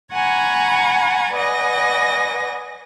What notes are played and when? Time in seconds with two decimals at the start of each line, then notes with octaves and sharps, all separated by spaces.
0.13 F#5 G#5 A#5 B5 C#6 G#6
1.34 B4 D5 D#5 F#5 G#5 A#6